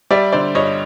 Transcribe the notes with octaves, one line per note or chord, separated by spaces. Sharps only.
G3 D5 E5
D3 C5 D5
G2 C#5 D#5